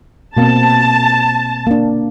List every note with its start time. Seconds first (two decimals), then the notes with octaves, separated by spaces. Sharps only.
0.37 B2 A#3 C4 A5
1.67 A#3 D4